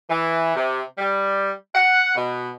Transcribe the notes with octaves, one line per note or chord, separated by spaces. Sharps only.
E3
C3
G3
F#5
B2